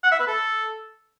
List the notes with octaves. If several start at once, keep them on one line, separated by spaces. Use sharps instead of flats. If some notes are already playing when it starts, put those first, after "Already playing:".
F#5
E5
B4
A4